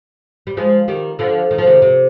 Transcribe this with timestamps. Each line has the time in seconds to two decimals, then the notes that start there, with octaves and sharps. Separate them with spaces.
0.47 G3
0.57 F3 G#3
0.88 D#3 G3
1.19 D3 F3
1.51 D#3
1.58 F3
1.67 C3 D#3
1.82 C3